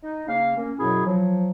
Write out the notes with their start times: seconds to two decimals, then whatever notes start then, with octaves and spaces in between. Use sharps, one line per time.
0.03 D#4
0.28 C#3 A#3 F5
0.57 A#3 C#4
0.79 F#2 B2 F#3 E4 G#4
1.06 F3 F#3